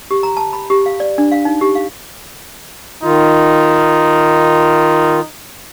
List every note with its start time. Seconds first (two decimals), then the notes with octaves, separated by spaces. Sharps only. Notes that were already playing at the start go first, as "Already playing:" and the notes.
0.11 G4
0.23 A#5
0.37 A5
0.53 B5
0.70 G4
0.86 F5
1.00 D5
1.18 D4
1.32 F5
1.45 D#4
1.61 G4
1.75 F5
3.03 D#3 D#4 F4